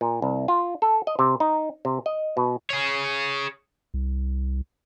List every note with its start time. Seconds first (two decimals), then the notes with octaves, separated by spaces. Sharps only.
0.01 A#2
0.22 C2
0.48 F4
0.82 A4
1.07 D#5
1.19 C3
1.40 D#4
1.85 C3
2.06 D#5
2.37 B2
2.70 G#4 C#5
3.94 C2